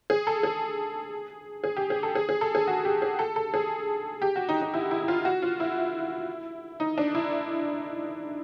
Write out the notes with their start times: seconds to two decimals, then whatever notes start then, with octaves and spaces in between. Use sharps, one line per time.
0.10 G#4
0.27 A4
0.43 G#4
1.64 G#4
1.76 G4
1.90 G#4
2.03 A4
2.15 G#4
2.29 G#4
2.41 A4
2.55 G#4
2.68 F#4
2.85 G4
3.02 G#4
3.19 A4
3.36 A4
3.54 G#4
4.22 G4
4.36 F#4
4.49 D#4
4.61 D#4
4.74 E4
4.91 E4
5.02 E4
5.08 F4
5.25 F#4
5.42 F4
5.60 E4
6.80 D#4
6.98 D4
7.15 E4